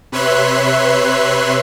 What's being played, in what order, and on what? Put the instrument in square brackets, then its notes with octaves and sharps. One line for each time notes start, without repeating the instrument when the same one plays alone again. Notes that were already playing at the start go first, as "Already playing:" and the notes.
[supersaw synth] C3 B4 C#5 E5 C6 F#6